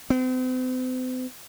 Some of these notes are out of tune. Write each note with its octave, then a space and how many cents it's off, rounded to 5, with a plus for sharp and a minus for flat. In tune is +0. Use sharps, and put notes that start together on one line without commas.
C4 -45